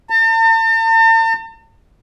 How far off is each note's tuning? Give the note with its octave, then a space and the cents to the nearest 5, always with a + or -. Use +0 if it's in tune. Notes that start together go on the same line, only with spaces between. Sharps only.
A5 +45